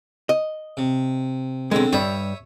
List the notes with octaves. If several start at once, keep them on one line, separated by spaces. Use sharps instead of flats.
D#5
C3
B1 D3 G#3 C4
G2 G3 C#5 E5 D#6